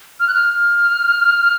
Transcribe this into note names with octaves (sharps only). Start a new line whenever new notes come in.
F6
F#6
F6